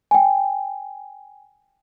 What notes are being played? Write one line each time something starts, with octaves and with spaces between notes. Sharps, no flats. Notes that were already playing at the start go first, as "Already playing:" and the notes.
G5 G#5